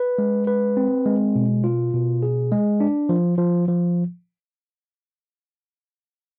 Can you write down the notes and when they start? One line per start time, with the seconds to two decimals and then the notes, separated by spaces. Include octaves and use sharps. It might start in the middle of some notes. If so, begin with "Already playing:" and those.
Already playing: B4
0.18 G#3
0.47 B4
0.77 C4
1.06 G#3
1.36 B2
1.64 F4
1.93 B2
2.23 G#4
2.52 G#3
2.80 D4
3.09 F3
3.38 F3
3.68 F3